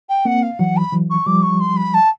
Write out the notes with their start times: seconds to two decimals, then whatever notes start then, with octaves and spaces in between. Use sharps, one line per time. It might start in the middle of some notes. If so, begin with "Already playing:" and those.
0.09 G5
0.25 A#3 C4 F#5
0.42 F5
0.59 E3 F#3 F#5
0.77 B5
0.92 E3 F#3
1.10 C#6
1.26 F3 G3 D6
1.42 C#6
1.60 C6
1.76 B5
1.94 A5